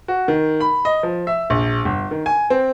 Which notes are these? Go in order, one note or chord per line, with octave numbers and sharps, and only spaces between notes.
F#4
D#3
B5
D#5
F3
E5
A#1
G1
D#3
G#5
C4